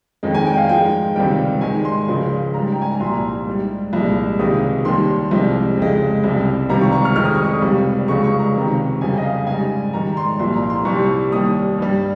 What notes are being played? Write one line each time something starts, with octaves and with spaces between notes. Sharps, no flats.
F2 D#3 G#3
G#5
G5
F5
G#2 F3 G#3 G5
C#2 C3 D#3 G3 G5
G#2 D#3 G#3 G#5
C6
C#2 C#3 F3 G#3
G#2 G3 A#5
G5
G#5
A#5
C2 A#2 F3 C6
G#2 G3
C2 A#2 F3 G#3
C#2 C3 D#3 G#3 D#6
D#2 D#3 G3 C6
C2 C3 F3 G#3
F2 C#3 G#3
C2 C3 G3
C#2 C3 D#3 G3 A#5
C#6
C#6
F6
F2 D#3 G#3 F6
D#6
C#6
D#6
C#2 C3 G3
C#2 C#3 G#3 C#6
C#6
A#5
C#2 C3 D#3
F2 C#3 G3 G#5
D#5
F5
G#2 G3 G#5
G#2 D#3 G3 A#5
C6
C2 A#2 F3 C6
A#5
C6
C2 C3 G3 C#6
D#2 D#3 G3 D#6
G2 G3